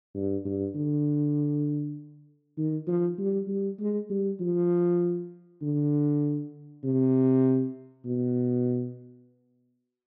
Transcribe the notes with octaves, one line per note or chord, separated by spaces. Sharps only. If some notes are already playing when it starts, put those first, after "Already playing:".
G2
G2
D3
D#3
F3
G3
G3
G#3
G3
F3
D3
C3
B2